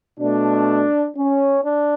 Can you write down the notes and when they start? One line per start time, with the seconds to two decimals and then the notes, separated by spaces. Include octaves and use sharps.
0.19 B2 A3 D4
1.17 C#4
1.65 D4